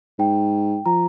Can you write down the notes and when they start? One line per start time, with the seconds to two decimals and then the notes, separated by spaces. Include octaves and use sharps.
0.19 G#2 G5
0.86 F3 A#5